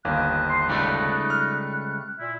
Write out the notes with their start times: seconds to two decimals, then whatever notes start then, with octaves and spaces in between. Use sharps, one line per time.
0.05 G1 D#2 F5 F#6
0.48 C6
0.68 C#2 G3 A3 D#4
1.30 F6
2.19 A#2 E4